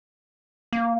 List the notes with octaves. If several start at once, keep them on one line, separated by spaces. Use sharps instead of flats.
A#3